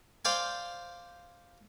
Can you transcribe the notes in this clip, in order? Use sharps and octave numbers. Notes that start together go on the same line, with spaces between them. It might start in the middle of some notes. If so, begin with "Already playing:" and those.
C5 D5 F5 G5 G#5